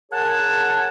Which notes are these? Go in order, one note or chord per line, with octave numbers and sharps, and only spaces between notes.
G#4 A#4 C#5 F#5 G#5 A5